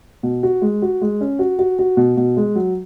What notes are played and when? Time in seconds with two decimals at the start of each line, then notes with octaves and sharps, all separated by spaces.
0.23 B2
0.43 F#4
0.62 G#3
0.82 F#4
1.02 G#3
1.21 C#4
1.39 F#4
1.59 F#4
1.79 F#4
1.97 B2
2.17 B2
2.37 G#3
2.55 F#3